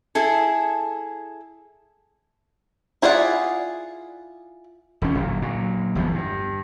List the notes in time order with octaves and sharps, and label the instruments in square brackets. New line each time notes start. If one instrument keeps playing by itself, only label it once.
[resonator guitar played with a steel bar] E4 G#4 A4
[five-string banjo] E4 F4 G#4 D5 F#5
[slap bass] E1 D2 C#4
G1 A#2 F#3
A#2 F#3
G1 E2 F3 B3
G2